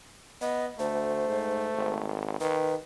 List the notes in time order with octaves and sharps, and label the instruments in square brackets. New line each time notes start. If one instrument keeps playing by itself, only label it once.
[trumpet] B3 [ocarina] D#5
[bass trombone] D2 [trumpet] A3 [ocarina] C5
[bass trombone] G#2
G#1
[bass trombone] D#3 [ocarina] B4